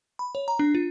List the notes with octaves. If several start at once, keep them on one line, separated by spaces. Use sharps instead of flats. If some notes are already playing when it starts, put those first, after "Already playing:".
B5
C#5
A#5
D4
F4